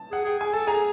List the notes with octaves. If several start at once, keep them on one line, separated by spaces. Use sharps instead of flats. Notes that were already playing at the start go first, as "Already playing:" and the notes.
Already playing: A5
G#4 F#5
G#4 G5
G#4 G#5
A4 A5
G#4 G#5 A#5